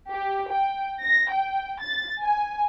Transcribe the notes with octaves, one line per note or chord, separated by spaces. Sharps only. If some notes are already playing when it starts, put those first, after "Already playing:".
G4
G5
A#6
G5
A6
G#5